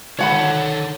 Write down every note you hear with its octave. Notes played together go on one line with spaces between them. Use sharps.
D3 D#3 A4 C#5 F#5 B5